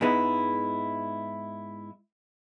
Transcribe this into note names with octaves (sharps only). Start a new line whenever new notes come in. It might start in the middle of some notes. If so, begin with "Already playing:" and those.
G#2 G#3 B3 D#4 E4